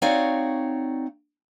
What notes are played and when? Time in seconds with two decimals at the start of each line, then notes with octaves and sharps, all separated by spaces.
0.02 C4 D#4 F#4 C#5 D5 F5